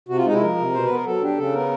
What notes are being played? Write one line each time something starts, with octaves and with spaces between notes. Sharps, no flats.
C3 F#4
F4
G#3 D#4
E4
F3 A#4
C3
B2 C5
B3 B4
A#4
F#3 A4
D4 G4
C#3 A4
B3 A#4